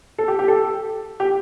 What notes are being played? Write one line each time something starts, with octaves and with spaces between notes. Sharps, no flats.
A4
G4
G4
A4
G4